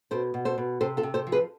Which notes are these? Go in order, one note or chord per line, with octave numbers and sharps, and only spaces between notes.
B2 A4 C5
B2
A4 C5
B2
C3 A4 C5
F4 A4
C3
A4 C5
F3
G#4 B4